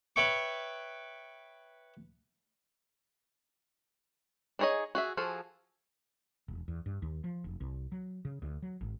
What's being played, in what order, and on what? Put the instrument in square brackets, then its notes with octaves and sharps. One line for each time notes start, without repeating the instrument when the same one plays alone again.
[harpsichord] B4 C#5 E5 G5 B5 C#6
[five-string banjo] D4 D#4 G#4 C#5 D#5
F#4 G#4 E5
F3 F4 F#4 G#4 A4
[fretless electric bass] E1
E2
G2
D#2
F3
F1
C2
F#3
C#3
D2
F#3
G#1